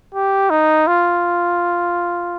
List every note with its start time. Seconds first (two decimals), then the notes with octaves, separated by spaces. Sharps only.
0.14 G4
0.50 D#4
0.87 F4